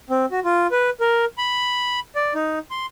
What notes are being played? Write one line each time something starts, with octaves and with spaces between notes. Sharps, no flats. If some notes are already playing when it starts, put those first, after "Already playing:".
C4
F#4
F4
B4
A#4
B5
D5
D#4
C6